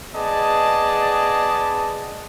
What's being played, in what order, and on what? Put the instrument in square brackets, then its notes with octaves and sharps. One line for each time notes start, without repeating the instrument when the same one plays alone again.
[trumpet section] B3 G#4 D5 D#5 A5